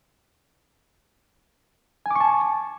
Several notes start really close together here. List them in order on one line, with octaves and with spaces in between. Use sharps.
G#5 D6 C#6 A5